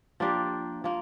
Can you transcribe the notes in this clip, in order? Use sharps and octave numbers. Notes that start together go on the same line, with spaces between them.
F3 A#3 D4 G4
F3 A#3